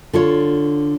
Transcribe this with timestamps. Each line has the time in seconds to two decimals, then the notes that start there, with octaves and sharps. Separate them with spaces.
0.13 D3 F4 C#5